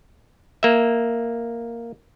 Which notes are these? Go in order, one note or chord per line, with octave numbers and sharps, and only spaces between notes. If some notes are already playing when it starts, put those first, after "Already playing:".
A#3 E5